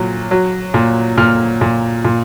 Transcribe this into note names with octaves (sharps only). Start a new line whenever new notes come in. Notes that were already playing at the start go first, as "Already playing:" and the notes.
Already playing: A#2 F#3
F#3
A#2
A#2 F6
A#2
A#2